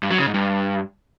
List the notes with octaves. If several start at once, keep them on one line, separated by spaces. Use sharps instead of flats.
G2
F#3
C#3
G#2
G2